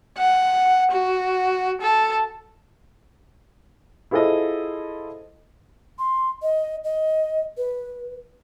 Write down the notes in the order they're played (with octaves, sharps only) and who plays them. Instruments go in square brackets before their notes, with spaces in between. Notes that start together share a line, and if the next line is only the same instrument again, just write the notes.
[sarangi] F#5
F#4
A4
[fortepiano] E4 F4 G#4 A4 C5 D#5
[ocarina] C6
D#5
D#5
B4